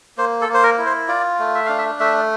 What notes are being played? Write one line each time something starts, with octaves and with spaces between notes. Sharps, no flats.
A#3 C5
A4
A#3
C5
A#4
E4
C5
F4 D5
A3
E5
D4 F5
E5
A3 E5